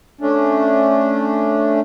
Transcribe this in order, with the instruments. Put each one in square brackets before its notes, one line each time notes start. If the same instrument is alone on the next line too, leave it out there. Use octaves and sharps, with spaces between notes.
[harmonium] A3 C#4 D4